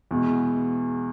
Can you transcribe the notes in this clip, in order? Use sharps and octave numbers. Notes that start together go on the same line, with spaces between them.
E2 B2 G#3